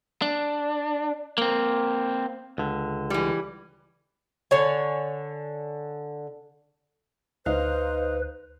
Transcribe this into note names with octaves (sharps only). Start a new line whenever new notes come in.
D4
A#3 C4
C#2 D3
E3 G3
D3 C#5 G#5
D2 D#4 B4 C5 F5